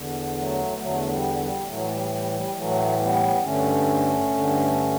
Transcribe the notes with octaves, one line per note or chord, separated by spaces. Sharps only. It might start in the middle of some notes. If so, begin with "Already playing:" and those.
Already playing: E2 D3
F#3 A3
B3
E2 D3 F#3 A3
F#3
G3
G3
A2 E3 F#3 A3
G3
G3
G3
A2 E3 F#3 A3
G3 B3
G2 D3 A3 C#4
G2 D3